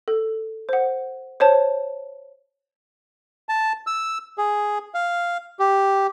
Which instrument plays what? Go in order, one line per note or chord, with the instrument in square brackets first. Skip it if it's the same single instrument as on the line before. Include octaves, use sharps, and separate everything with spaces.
[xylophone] A4
C5 F#5
C5 C#5 A5
[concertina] A5
E6
G#4
F5
G4